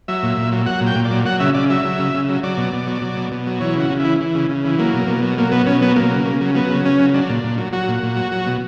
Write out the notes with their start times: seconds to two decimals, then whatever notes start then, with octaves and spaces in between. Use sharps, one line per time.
0.08 F#3 E5
0.23 A#2
0.37 A#2
0.52 F#3
0.66 F#3 F#5
0.81 A#2
0.87 G5
0.95 A#2
1.05 D5
1.11 F#3
1.25 F#3 F#5
1.40 C#3 E5
1.54 C#3 D5
1.70 F#3 E5
1.85 F#3
1.99 C#3
2.14 C#3
2.29 F#3
2.43 F#3 D5
2.57 B2
2.73 B2
2.87 F#3
3.02 F#3
3.17 B2
3.31 B2
3.47 F#3
3.60 E3 C#5
3.75 C#3 F#4
3.90 C#3
4.00 E3 E4
4.20 E3
4.35 C#3
4.49 C#3
4.65 E3
4.78 F#3 A#3
4.94 B2
5.08 B2
5.23 F#3
5.38 F#3 A#3
5.52 B2 B3
5.66 B2 C#4
5.81 F#3 B3
5.96 F#3 A#3
6.11 C#3
6.25 C#3
6.41 F#3
6.55 F#3 B3
6.70 C#3
6.85 C#3 C#4
6.99 F#3
7.14 F#3 D4
7.30 A#2
7.44 A#2
7.58 F#3
7.73 F#3 F#4
7.88 A#2
8.03 A#2
8.17 F#3
8.32 F#3
8.47 B2